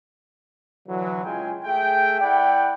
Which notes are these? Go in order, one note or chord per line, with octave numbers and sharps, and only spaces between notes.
D3 E3 F#3
C#3 G#3 F4 G5 G#5
A3 G#4 E5 G5
E4 D5 F#5 G5